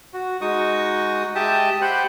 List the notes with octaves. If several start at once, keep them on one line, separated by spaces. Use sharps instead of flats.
F#4
G#3 D#4 F#4 C#6 D#6
G#3 G4 E5 G5 A5 D#6
G4 C5 F#5 G5 B5 F#6